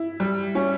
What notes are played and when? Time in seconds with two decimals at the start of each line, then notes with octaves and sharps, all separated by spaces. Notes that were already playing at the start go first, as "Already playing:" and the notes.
Already playing: E4
0.20 G3
0.55 C#4